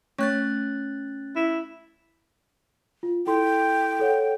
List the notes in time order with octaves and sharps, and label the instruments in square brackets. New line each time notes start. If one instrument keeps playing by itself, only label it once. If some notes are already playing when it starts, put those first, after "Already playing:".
[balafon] A3 C#5 C#6 [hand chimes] C#4 F#6 A6
[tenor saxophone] E4
[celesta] F4
[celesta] E4 A4 C6 [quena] G5
[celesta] A4 C#5 F#5